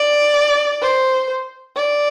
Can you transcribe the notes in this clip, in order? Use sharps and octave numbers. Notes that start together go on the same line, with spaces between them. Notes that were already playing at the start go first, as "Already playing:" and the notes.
Already playing: D5
C5
D5